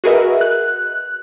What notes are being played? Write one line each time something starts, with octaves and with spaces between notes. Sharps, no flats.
F#4 G#4 A#4 B4 D#5 E5
F#6